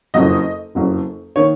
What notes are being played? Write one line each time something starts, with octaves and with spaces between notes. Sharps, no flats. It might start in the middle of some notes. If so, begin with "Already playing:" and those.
F#1 F2 C#3 F#3 D#5
F#1 F2 C#3 F#3
D#3 A#3 C#5